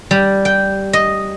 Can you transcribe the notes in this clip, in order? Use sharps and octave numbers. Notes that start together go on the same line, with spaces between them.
G3
G5
D#5